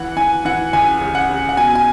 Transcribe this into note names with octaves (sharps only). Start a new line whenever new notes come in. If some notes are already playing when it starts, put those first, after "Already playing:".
Already playing: E3 F#5
E3 G#5
E3 F#5
C#2 G#5
C#3
F#5
C#3
F#5
B2 G#5
G#5